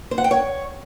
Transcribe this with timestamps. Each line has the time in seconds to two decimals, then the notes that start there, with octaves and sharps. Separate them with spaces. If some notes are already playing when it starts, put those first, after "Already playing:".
0.11 C5
0.18 F#5
0.24 G5
0.31 C#5